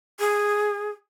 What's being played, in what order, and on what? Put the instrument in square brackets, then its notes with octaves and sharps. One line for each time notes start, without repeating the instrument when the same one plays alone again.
[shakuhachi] G#4